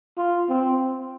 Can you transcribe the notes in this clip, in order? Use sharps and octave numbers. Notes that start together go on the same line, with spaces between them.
F4
C4